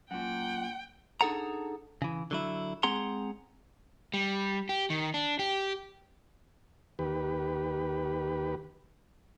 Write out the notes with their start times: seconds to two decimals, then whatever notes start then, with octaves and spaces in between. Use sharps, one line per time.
0.11 F#2 A#2 F#5 G5
1.21 D4 D#4 G#4 A4 F#5 A#5
2.02 C#3 E3
2.31 D3 F#3 E4
2.83 G#3 C4 G#4 F#5 A#5 C6
4.14 G3
4.69 G4
4.90 D#3
5.14 D4
5.39 G4
6.99 D#2 G4 B4